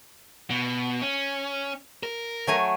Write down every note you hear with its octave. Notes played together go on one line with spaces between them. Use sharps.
B2
C#4
A#4
F#3 A3 G#5